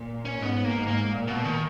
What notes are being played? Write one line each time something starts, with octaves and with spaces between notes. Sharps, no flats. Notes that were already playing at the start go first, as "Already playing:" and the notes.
Already playing: A#2
C#4
G#2 B3
A#3
G#2
A#3
A#2
B2
D#3